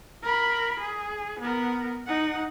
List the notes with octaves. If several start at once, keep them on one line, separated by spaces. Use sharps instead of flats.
A#4 B5
G#4
B3 A#4
D#4 F#5